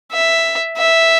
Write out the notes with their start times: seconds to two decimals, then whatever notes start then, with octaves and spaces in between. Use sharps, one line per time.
0.12 E5
0.77 E5